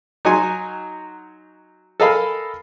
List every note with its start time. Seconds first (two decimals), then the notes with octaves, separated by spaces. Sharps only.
0.25 F#3 D#4 F#4 G#5 C6
2.00 A4 A#4 D#5 F5 G#5 B5